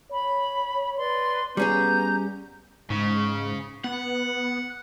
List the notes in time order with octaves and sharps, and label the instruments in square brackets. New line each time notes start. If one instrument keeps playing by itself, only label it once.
[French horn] C#5 [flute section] B5
[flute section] B4 D5 C6
[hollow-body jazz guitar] G3 C#4 G#4 [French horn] B3 [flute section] A#5 G6
[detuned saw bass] G#2 [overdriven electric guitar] C#3
[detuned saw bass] B3 [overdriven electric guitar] F#5